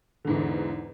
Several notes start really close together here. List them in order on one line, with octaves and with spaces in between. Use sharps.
D3 G#2 E2